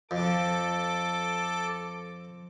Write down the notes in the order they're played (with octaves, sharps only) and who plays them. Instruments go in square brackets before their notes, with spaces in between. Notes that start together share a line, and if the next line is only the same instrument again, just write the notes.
[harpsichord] F2 [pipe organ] A4 D6